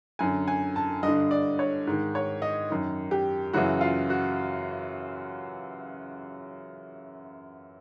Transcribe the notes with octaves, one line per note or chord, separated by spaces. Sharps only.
F#2 D3 G#5
G#5
A5
G2 D3 D#5
D5
C#5
G#2 D#3
C#5
D#5
F#2 D#3
G4
F#2 C#3 E3 F#4
F4
F#4